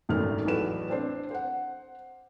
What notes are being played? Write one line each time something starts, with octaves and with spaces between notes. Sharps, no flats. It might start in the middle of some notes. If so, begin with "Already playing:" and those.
D#1 G#1 F#2 D#3 A3 F6
A1 E2 F#3 A4 B4 E7
C4 D4 C5
C5 F#5